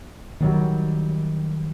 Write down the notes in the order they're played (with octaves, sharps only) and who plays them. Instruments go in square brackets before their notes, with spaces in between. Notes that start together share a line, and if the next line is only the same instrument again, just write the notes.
[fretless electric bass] D#3 F#3 G3